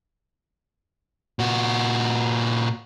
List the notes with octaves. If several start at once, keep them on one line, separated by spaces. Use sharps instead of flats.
A#2 F#4